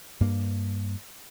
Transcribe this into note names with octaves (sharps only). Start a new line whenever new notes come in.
G2 A#3